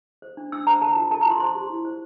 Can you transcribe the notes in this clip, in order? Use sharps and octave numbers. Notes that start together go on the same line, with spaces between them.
C5
D4
D4 E6
C5 A#5
A#4 A5
F4
A#4 A5
A#5
F4 C6
C5 C6
G4
E4
C5